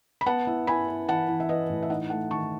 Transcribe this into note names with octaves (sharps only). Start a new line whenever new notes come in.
B5
B3 F#5 A5
E4
E4 G#5 B5
E4
E3 F#5 A5
E3
E5
E3 B4 D#5
A2
E5
D#4 D#5 F#5
A3 F#5 A5
D#3 A5 C#6